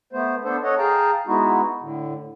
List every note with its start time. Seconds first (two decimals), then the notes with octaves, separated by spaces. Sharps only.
0.13 A3 B3 C5
0.44 B3 D4 A4 C5
0.64 A4 C#5 D#5 F#5
0.78 G#4 F5 G5 A5 A#5
1.27 G#3 B3 D#4 E4 F#4
1.82 A2 D3